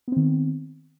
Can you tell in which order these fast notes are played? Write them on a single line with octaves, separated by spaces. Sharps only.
B3 C4 D#3